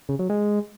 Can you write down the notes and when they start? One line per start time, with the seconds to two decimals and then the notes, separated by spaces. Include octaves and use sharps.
0.09 C#3
0.19 F#3
0.29 G#3